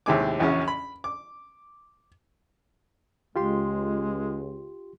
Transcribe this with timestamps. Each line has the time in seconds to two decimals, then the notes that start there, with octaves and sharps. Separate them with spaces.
0.06 D#2 A2 C3 G#3 G#5 D6
0.40 A#1 E2 C#3 C#4 F#4
0.68 B5
1.04 D6
3.36 C#2 G#3 F4 G4 C6